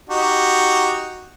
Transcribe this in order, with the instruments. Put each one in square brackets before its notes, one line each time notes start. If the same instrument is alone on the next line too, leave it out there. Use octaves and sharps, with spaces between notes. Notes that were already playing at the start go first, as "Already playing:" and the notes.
[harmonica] D#4 F#4 G4